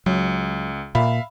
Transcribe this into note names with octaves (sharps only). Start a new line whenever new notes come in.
C#2 F#3
A#2 E5 F5 B5